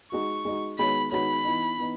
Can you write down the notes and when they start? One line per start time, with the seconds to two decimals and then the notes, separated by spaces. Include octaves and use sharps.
0.12 G#3 D#4 F#4 C#6
0.45 G#3 D#4 F#4
0.78 D#3 G#3 B3 F#4 C#5 B5
1.12 D#3 G#3 B3 F#4 C#5 B5
1.44 E3 B3 D#4
1.78 E3 B3 D#4